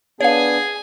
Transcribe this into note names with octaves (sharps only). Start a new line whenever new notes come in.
B3 D4 G#4 C#5 F5 G#5